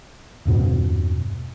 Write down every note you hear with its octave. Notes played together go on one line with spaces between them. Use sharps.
E1 G2 B2 C4